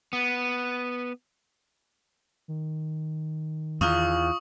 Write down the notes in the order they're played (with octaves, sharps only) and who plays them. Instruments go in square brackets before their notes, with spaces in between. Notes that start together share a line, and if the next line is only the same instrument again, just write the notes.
[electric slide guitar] B3
[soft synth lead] D#3
[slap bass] E2 [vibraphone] F4 F5 [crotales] C#6 D#6